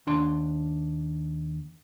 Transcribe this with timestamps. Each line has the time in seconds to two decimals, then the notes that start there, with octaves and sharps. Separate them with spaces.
0.07 D#2 D4 C6